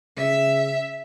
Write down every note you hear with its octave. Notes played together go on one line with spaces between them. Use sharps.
C#3 E5